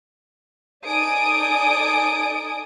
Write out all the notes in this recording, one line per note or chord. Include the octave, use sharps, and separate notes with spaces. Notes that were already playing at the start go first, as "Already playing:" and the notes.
D#4 A4 D5 G#5 D#6 D7